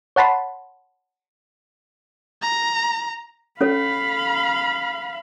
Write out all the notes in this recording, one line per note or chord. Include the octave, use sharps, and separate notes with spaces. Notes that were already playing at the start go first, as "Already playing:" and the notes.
C#5 F#5 A5 B5 C6
A#5
C#4 A4 C#5 F5 B5